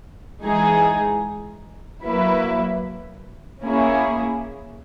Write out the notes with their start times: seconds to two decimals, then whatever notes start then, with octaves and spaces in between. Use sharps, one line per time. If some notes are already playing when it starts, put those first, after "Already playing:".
0.44 E3 G#3 D#4 G#4
2.04 F#3 A#3 E4 B4
3.64 A#3 C#4 E4 G#4